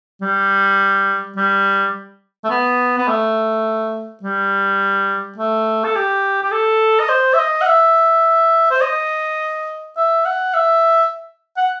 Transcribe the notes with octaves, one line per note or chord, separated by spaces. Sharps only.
G3
G3
A3
B3
B3
A3
G3
A3
A4
G4
G4
A4
D#5
C5
E5
D#5
F#5
E5
C5
D#5
E5
F#5
E5
F#5